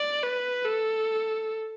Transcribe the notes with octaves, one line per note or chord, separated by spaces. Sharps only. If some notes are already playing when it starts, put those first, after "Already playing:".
Already playing: D5
B4
A4